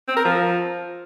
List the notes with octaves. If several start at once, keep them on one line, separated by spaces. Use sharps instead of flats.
C4
A#4
F3